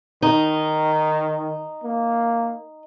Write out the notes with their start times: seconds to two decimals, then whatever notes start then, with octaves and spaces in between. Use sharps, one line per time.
0.22 D#3 D#4
1.83 A#3